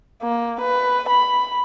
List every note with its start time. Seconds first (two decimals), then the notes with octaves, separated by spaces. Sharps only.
0.23 A#3
0.61 B4
1.09 B5